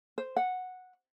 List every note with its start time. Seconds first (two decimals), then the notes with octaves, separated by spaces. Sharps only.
0.18 C5
0.36 F#5